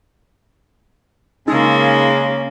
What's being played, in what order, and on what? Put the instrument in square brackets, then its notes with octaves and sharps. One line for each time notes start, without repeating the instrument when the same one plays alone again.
[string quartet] C#3 A#3 [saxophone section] G#3 [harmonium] C#4 [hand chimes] D#4